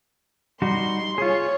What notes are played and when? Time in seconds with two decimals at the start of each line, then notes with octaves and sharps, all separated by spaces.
0.62 G3 D#4 F#4 C6
1.18 F4 G#4 C#5